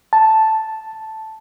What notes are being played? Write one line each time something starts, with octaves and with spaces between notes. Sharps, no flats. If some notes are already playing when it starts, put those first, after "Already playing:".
A5